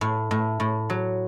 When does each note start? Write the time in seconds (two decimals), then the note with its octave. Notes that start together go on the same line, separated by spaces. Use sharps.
0.01 A2
0.31 A2
0.60 A2
0.90 F#3